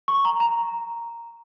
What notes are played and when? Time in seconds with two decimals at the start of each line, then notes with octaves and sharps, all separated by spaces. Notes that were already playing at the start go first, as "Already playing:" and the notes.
0.08 C#6
0.25 A#5
0.40 A#5